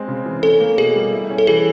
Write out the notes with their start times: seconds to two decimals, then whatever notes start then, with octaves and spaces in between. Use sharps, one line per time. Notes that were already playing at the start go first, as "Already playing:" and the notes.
Already playing: G#3 C4
0.08 C#3
0.25 E3
0.43 C#4 A4
0.60 A#3
0.78 B2 G#4
0.95 G3
1.12 E4
1.30 C#4
1.38 A4
1.47 E3 G#4